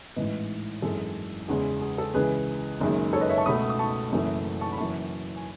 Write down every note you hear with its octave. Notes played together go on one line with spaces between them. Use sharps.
A1 G#2 E3 B4 D#5
G#1 F#2 E3 G#3 A4
E2 C#3 G#3 G#4
G#4
A4
C#2 C#3 E3 G#4 B4
F#1 F#2 D#3 G#3
A4 C#5
B4 D#5
C#5 E5
A5 C#6
C#2 B2 A3 B5 D#6
D#6
A5 C#6
F#1 F#2 E3 A3
A5 C#6
B5
F#1 F#2 E3 A5 C#6
G#5